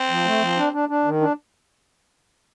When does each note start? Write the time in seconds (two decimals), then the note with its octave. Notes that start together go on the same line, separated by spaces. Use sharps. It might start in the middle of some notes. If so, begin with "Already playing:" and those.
Already playing: C4
0.10 F3
0.25 A3
0.41 F3
0.57 D4
0.73 D4
0.89 D4
1.05 D#3
1.21 D4